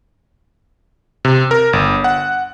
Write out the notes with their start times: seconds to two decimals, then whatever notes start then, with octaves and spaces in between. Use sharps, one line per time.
1.25 C3
1.51 A#4
1.73 G1
2.04 F#5